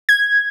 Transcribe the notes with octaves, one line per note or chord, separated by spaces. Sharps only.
G#6